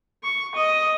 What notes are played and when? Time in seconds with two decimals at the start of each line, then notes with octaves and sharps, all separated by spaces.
0.24 C#6
0.55 D#5